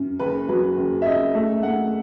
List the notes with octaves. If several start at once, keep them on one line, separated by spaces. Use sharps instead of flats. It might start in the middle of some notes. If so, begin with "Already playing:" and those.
Already playing: F#2
F#1 B4
F#3 B4
F#1
E5
F#1 D#5
A3 E5
A3 F#5